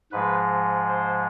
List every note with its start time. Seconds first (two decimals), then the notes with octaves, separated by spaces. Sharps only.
0.12 G#2 F3 G#3 B4
0.88 C5